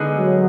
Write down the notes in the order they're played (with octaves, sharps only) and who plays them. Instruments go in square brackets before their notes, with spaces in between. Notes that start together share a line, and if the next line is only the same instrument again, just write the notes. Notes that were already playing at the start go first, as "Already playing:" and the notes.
Already playing: [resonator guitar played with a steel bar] D3 G#3 B3 D#4 G#4
[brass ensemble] F#3